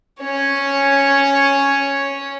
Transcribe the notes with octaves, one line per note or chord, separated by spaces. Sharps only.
C#4 C#5